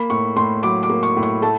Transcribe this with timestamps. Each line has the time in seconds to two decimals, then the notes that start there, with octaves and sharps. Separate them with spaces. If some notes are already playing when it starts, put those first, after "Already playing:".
Already playing: A#3 B5
0.10 A2 C#6
0.36 A2 C6
0.63 F#3 D6
0.83 D6
0.89 A#3
1.03 C#6
1.17 A2
1.23 C#6
1.42 A3 A5